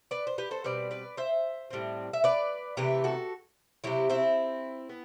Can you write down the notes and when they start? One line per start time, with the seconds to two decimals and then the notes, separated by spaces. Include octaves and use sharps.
0.11 B4 D5
0.27 C5
0.38 G4 B4
0.51 A4 C5
0.64 B2 G3 C4 B4 D5
0.91 B4 D5
1.17 C5 E5
1.70 A2 G3 C4
2.13 E5
2.24 B4 D5
2.77 C3 E3 A3 G4 B4
3.04 F#4 A4
3.84 C3 F#3 C4 E4 G4
4.10 C4 E4
4.89 B3